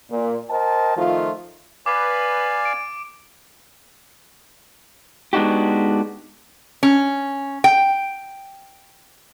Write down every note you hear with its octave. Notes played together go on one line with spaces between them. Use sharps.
A#2
A#4 C5 D#5 G5 A5
D#3 F3 A3 F4
B4 D5 F5 G#5 D6
D7
G#3 B3 D4 D#4 F#4 G4
C#4
G5